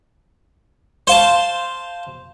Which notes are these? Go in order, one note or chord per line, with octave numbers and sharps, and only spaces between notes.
C5 F5 A5